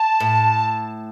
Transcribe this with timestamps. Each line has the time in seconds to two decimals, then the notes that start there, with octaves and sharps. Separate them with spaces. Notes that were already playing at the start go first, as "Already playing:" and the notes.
Already playing: A5
0.20 A2